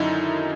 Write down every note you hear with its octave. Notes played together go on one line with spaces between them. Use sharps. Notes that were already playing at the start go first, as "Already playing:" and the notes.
Already playing: F#2 D3 D#3 D#4 E4